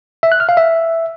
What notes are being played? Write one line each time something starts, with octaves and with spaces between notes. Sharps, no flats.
E5
F#6
F6
F5
E5